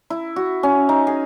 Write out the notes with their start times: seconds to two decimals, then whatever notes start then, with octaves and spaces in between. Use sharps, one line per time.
0.10 E4
0.36 F#4
0.63 C#4
0.89 D#4
1.07 G#4